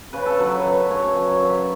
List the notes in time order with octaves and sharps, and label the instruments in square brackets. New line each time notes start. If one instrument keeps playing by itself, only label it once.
[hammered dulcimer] C#3 B4
A4
F#3 B4
B4
F#2 B4
C#3 C#5
F#3 A5
A5
F#2
B5